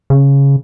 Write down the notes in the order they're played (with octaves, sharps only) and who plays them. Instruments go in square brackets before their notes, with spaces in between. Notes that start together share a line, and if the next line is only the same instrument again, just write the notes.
[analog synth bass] C#3